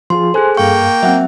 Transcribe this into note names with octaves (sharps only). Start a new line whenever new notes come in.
F3 F4 G#4 C6
G#4 A4 C5 G#5 F#6
G2 A#3 F5 G5 C#6
F#3 C4 E5 F#5